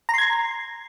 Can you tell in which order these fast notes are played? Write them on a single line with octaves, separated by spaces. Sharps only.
A#5 C6 G#6